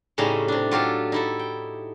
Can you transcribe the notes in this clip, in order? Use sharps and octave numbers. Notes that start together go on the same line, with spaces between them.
A2 C#3 G3 C#4 D#4
C3 D4
F#3 F4 G4 A4
D#4 E4 A4
G5